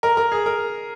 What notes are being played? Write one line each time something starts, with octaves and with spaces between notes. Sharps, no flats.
A#4
A#4
G#4
A#4